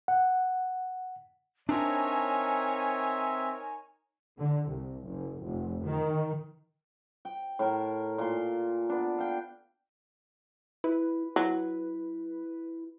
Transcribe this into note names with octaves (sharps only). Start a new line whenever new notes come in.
F#5
C4 D4 D#4 A#4 C#5 E5 G#5
D3
C2
F#1
F1
D#3
G5
A2 A#4
A#2 C6
B3 D4
F5 G5
E4 B4
F#3 E4